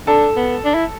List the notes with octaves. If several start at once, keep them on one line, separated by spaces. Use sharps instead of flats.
D4 A4 A5
B3
D4
E4